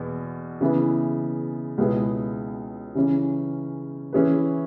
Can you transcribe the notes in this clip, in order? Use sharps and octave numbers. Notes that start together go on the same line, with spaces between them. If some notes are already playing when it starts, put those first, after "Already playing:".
Already playing: E2 B2 B3
C#3 E3 B3 E4
C#2 B2 B3 E4 G#4
C#3 E3 C#4
E3 C#4 E4 G#4 B4